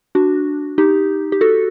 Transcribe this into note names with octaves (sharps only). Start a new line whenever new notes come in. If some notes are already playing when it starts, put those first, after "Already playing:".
D4 F#4
D#4 G4
G4
F#4 A4